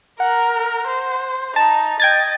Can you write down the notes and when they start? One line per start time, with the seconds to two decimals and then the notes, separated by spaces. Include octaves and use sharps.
0.20 A#4 F#5
0.87 C5
1.56 D#4 A5
2.00 D#5 G5 G#6 A6